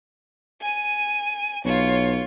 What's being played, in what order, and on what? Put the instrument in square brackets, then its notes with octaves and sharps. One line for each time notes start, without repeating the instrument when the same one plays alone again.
[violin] G#5 D#7
[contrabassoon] B1 [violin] F4 C#5